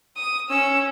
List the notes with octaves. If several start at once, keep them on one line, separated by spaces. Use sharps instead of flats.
D#6
C#4 E6